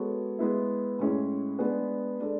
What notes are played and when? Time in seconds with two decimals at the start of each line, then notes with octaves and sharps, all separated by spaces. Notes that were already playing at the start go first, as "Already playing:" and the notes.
Already playing: G#3 B3 F#4 A4 C#5
0.39 G#3 B3 E4
0.99 A2 G#3 C#4 E4 G#4
1.59 G#3 B3 D4 G#4 B4
2.20 G#3 D4 A4 D5